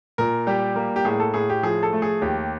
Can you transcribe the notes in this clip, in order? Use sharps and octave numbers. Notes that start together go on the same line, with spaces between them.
A#2 A#4
G3 G4
A#3
G4
A2 G#4
A4
A2 G#4
G4
F3 G#4
A4
A3
G#4
D#2 G4